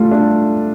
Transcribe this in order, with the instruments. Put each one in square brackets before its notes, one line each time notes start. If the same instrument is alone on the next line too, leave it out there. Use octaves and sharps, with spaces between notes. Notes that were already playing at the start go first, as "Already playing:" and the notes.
Already playing: [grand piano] G3 F4 A4 [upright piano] A3
[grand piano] D4